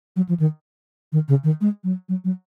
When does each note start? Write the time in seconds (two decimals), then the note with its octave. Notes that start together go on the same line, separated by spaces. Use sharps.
0.16 F#3
0.29 F3
0.40 D#3
1.12 D#3
1.28 C#3
1.44 D#3
1.61 G#3
1.84 F#3
2.09 F#3
2.24 F#3